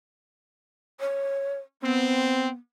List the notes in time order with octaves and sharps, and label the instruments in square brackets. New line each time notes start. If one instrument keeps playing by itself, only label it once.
[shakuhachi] C#5
[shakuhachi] B3 [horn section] C4